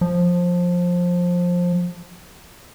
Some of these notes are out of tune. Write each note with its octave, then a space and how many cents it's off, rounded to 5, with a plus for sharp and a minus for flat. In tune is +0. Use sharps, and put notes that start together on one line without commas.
F3 +15